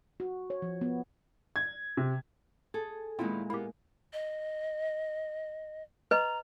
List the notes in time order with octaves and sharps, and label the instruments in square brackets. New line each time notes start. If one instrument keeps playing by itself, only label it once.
[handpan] F#4
C#5
F3
B3
[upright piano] G#6
C3
[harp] G#4 [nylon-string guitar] A4
[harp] A#2 G#3 [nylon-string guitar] D#3 B3 E4 [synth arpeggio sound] C4 F4
[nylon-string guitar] A#3 B3 [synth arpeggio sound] E4 G4
[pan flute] D#5
[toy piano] B4 D#5 [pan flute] A#5